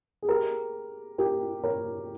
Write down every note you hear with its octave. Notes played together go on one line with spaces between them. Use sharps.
G#4
G4 A#4
G4 A#4
A#4 C#5